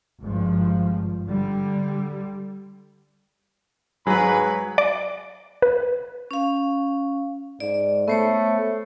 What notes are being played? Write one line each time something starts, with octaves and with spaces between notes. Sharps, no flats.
G#1 G2 F3
D3 G3
G#2 F#3 G#4 B4 B5
D5
B4
C#4 F5
G#2 D5
A3 B3 C5 C#5